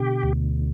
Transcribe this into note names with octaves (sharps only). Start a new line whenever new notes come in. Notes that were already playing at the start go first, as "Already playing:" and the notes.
Already playing: B2 D3 G4
D2